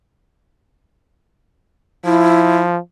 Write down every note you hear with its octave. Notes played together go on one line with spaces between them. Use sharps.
F3 E4